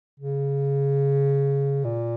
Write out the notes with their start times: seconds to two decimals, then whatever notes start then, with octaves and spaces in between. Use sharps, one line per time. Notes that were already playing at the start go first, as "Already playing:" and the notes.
0.20 C#3
1.85 A#2